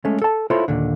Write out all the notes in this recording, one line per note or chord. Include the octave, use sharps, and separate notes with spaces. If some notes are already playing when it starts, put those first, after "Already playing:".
G#3 A3 C#4
A4 A5
E4 F4 A4 C5 C#5
D#2 A#2 D3